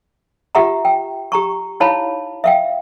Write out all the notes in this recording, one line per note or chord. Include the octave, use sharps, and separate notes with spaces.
F4 G4 E5 F#5 A#5
G5
G4 A#5 C#6
D#4 E4 C#5 F5 A5 B5
E5 F5 G5